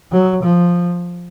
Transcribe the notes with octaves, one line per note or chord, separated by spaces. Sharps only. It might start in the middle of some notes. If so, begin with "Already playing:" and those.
F#3
F3